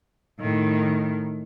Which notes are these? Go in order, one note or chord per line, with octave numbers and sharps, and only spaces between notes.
A2 D#3